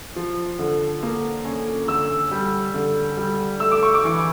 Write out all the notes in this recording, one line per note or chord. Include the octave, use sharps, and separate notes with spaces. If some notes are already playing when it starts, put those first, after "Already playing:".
F3
D3
A#3
C#4
D3 E6
G3
D3
G3
A3 E6
D6
C#6
D6
E3